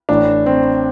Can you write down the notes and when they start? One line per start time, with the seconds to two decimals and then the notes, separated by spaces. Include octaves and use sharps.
0.09 A1 A2 E3 D4
0.46 C4